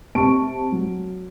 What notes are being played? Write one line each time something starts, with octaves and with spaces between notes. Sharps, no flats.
C3 A5 C#6 D7
F#3